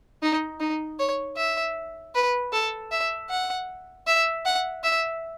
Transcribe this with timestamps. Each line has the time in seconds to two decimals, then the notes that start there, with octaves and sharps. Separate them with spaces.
0.22 D#4
0.60 D#4
0.99 C#5
1.37 E5
2.15 B4
2.53 A4
2.91 E5
3.30 F#5
4.07 E5
4.45 F#5
4.84 E5